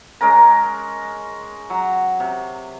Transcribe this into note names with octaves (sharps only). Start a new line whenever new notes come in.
G#3 C#4 A#4 A#5
F#3
C3